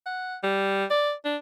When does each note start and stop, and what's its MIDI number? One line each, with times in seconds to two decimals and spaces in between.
0.06 0.37 78
0.44 0.85 55
0.90 1.13 74
1.25 1.37 62